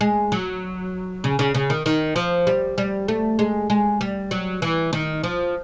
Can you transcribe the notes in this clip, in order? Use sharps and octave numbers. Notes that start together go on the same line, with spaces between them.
G#3
F#3
C#3
C#3
C#3
D#3
D#3
F3
G3
G3
A3
G#3
G#3
G3
F#3
E3
D#3
F3